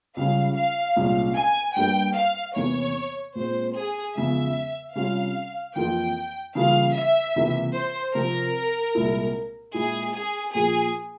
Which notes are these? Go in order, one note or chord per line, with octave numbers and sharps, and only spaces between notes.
C#2 C#3 G3 C#4 F5
F5
C2 A#2 G#3 C#4 F4 F5
G#5
G2 G3 A#3 G5
F5
E2 C3 E3 A#3 C#5
A#2 G#3 C4 C5
G#4
E2 C#3 F3 G#3 E5
C3 G3 C#4 F4 F5
F2 E3 A#3 F4 G5
C#3 E3 G3 A#3 F4 F5
E5
C#2 C3 E3 A#3
C5
C3 F3 C4 A#4
C2 A#2 G#3 E4
A#2 G#3 E4 G#4
G#4
A#2 F3 A#3 G#4